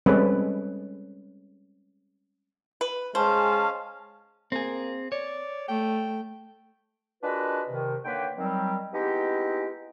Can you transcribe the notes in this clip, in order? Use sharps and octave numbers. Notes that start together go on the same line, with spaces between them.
G3 G#3 C4 C#4 A4 B4
B4
G#3 C#4 C5 F5 A5
A#3 C4 G#4
C#5 D5
A3 G5
G#3 D4 F4 F#4 A#4 B4
C3 D#3
D3 D#3 A#3 B4 C#5 G5
D#3 F#3 G3 C4
G#3 B3 C4 D#4 E4 G4